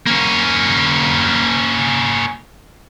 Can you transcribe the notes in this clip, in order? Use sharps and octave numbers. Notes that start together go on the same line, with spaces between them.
A#3 C#4